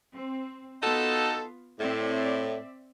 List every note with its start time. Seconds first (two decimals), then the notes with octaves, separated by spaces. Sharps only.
0.14 C4
0.82 B3 D#4 F4 F#4 A4
1.80 A2 C4 D5 E5